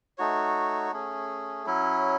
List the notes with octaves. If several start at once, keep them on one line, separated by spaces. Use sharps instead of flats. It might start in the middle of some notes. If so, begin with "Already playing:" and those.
A3 D#4 F#4 C#5
A3 C#4 G#4
F#3 C#4 E4